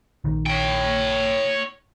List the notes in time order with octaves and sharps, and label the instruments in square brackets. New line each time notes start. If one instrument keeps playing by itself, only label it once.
[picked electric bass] A#1 D#3
[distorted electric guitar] C#5 G5